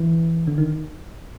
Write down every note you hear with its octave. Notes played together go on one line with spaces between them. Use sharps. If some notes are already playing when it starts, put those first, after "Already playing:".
Already playing: E3
D3
D#3